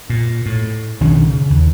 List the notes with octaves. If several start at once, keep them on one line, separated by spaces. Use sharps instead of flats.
A#2
A2
B1 D#3 C#4 D4
C#3
D#2